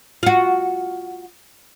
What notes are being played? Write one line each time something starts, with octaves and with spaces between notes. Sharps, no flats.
F4 F#4